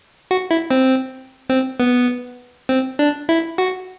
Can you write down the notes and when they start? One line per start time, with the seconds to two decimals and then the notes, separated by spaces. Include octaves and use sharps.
0.31 F#4
0.51 E4
0.71 C4
1.50 C4
1.80 B3
2.69 C4
2.99 D4
3.29 E4
3.58 F#4